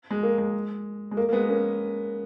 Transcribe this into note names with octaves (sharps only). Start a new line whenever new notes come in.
G#3
A#3
G#3
G#3
A#3
A#3
G#3 B3
A#3 C#4